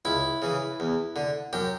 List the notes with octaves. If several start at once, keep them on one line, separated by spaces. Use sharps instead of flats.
C#2 E4
C#3 E3
E2
D3
F#2 G4